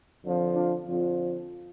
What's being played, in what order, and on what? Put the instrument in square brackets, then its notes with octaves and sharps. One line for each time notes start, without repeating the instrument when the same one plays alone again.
[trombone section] F2 D3 F3
D4 F4
F2 D3 F3